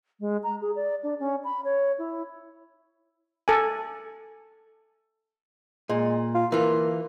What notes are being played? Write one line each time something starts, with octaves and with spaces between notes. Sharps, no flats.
G#3
A#5
G#4
D5
D4
C#4
B5
C#5
E4
A4 G#5
A#2 G#3
F4
E3 A#3 F4